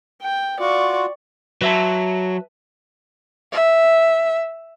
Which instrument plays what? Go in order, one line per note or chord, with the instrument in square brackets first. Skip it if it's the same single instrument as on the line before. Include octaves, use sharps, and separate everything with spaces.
[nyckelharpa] G5
[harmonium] F4 F#4 [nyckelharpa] D5 C#6
[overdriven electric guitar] F#3 [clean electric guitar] B4 E5 A5
[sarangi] E5